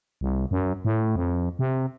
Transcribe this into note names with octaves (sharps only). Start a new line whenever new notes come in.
C2
F#2
A2
F2
C3